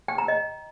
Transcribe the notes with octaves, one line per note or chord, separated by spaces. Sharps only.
G5
A#5
D#5